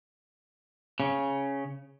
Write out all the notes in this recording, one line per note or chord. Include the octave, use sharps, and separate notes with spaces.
C#3